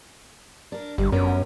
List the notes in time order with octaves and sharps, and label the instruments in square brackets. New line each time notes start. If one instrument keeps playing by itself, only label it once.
[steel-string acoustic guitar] D4 A#4
[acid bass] G1 [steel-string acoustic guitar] G3
[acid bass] F#2 [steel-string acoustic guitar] B3 C#4 A#4